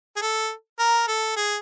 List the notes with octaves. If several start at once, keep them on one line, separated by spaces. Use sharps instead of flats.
G#4
A4
A#4
A4
G#4